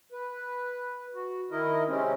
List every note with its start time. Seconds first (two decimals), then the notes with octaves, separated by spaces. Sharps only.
0.12 B4
1.15 F#4
1.51 D#3 E4 A#4 D#5
1.88 C3 G#3 C4 C#4